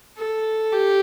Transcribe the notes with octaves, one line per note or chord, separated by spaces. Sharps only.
A4
G4